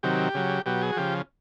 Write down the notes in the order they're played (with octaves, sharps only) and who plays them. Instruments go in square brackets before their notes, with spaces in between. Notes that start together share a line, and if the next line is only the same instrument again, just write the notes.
[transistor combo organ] C3 D#3 F#3 G4
C#3 F#3
B2 F#3 G4
G#4
F#4
C#3 F3 G4